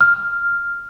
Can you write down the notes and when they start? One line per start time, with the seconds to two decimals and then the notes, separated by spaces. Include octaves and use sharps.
0.01 F6